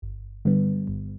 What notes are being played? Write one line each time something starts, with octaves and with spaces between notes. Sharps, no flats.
G1
G2 D3 G3 B3
G1